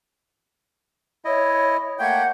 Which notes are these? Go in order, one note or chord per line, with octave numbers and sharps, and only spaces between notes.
E4 C#5 D#5
A3 A#3 F#5 G5 G6 G#6